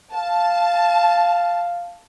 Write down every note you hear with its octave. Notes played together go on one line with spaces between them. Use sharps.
F5 A5